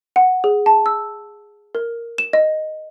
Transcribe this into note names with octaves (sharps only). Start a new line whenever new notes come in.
F#5
G#4
A5
E6
A#4
E7
D#5